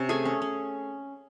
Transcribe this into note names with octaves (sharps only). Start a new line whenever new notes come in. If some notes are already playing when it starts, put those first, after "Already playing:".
Already playing: C3 C#4
A3 G#4 G#5
C#4
C#4